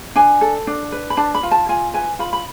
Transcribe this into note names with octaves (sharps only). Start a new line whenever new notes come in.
D4 G#5
A4
D4
B4
B5
D4 A5
B5
F4
A5
F4 G#5
B4 G#5
F4 B5
B5